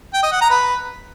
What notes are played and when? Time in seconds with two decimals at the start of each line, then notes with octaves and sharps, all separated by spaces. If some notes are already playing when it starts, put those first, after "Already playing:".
0.13 G5
0.23 D#5
0.32 F#5
0.41 A#5
0.50 B4